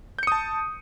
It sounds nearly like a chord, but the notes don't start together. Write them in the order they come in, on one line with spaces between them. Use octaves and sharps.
G6 C#7 D#6 A5